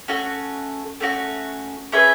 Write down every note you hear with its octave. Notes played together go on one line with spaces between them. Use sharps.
A3 C#4 F#4
A3 C#4 F#4
C#4 G#4 B4 E5